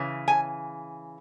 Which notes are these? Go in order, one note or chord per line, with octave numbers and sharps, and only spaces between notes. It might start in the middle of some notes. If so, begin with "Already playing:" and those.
Already playing: C#3 E3
G#5